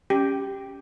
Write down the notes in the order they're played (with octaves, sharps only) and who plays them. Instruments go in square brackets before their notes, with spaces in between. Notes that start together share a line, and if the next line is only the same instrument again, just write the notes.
[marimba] C#4 [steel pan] G4